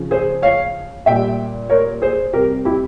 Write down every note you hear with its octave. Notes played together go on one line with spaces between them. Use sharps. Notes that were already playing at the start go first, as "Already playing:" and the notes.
Already playing: C#3 F3
G#4 C5
C#5 F5
A#2 G3 E5 G5
A#4 C#5
G#4 C5
C3 G3 G4 A#4
E4 G4